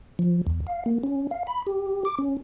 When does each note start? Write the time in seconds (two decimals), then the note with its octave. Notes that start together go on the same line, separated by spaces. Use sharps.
0.19 F3
0.47 E2
0.67 F5
0.86 A#3
1.03 C#4
1.31 F5
1.47 B5
1.67 G4
2.05 D6
2.19 C#4